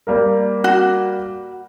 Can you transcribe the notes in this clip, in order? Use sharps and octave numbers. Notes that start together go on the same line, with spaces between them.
G3 A#3 A#4
F#4